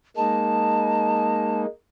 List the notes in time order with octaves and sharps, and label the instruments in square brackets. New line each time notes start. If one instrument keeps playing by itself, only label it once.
[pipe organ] G#3 A#3 D#4 [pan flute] A5